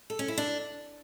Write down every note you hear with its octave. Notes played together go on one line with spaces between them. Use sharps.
A4
C#4
E4
D4